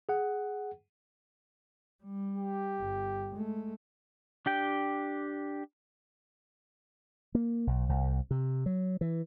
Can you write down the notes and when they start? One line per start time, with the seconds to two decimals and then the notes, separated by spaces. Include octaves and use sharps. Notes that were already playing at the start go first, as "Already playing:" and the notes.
0.09 G#4 F#5
2.03 G3
2.37 G4
2.80 G1
3.35 G#3 A3
4.46 D4 G4 G5
7.35 A#3
7.67 B1
7.89 C2
8.31 C3
8.66 F#3
9.01 E3